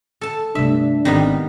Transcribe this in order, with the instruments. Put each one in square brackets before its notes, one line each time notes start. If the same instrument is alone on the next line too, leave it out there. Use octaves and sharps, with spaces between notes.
[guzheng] A4 A5
[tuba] G2 [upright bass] C3 A3 [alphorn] D4 [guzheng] E5
[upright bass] G#1 [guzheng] D#3 G3 B3 [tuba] C4